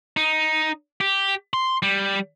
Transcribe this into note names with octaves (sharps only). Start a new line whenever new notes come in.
D#4
G4
C6
G3